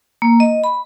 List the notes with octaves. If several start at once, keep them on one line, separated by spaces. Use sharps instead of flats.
A#3
D#5
B5